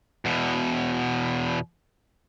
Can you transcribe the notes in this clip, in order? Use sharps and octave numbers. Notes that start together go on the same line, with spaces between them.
E2 B2